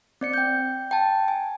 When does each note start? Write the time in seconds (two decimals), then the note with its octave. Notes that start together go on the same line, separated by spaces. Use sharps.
0.21 C4 D5 C#7
0.33 G5 G6
0.91 G5 A5
1.28 G#5